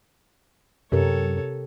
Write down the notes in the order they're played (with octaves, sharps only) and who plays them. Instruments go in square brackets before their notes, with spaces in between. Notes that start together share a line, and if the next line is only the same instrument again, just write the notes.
[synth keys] F#2 [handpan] C3 G4 A#4 [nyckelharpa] A4 C#5